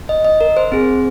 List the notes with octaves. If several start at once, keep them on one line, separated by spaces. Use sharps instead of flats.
D#5
D#5
A#4
C5
C4 G#4